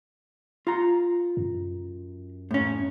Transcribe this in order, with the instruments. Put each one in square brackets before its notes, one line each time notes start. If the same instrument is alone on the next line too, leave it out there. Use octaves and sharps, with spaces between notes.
[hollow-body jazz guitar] F4 A#5
[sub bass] F#2
[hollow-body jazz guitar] A2 C#4